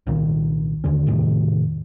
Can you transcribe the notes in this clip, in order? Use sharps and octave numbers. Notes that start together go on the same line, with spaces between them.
C2 A#2 D#3
D#2 D3 C#4
E2 A2 C3 D#3